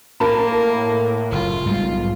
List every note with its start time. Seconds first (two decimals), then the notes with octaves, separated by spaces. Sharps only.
0.20 A2 A#3 A#4 A5 B5
1.32 F#1 F4
1.65 B1 G#2 G3 G#3